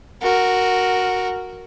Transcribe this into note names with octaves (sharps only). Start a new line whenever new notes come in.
F#4 A#4